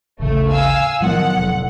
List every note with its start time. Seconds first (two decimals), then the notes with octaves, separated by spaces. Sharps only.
0.20 A1 D#2 C#3 A3
0.49 F5 G#5 E6
1.01 A2 D#3 F3 F#3 B3 F#5
1.35 F1